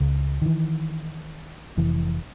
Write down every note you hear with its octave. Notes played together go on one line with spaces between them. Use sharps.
C#2
D#3 E3
F1 E3